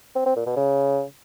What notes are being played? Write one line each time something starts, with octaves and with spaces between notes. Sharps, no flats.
C4
C4
A#2
B2
C#3